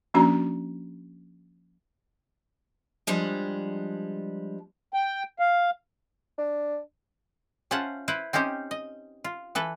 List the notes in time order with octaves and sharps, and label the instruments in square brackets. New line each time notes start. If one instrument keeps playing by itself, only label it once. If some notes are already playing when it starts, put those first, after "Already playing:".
[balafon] F3 A#3 C#4 D4 F#4 A#5
[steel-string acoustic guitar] F3 G3 G#3 D4
[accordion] G5
F5
[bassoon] D4
[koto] C#4 F4 C5 E5 F#5 A5
E4 B4 C5
C4 C#4 D#4 G4 C5
D#5
F4
E3 A4 B4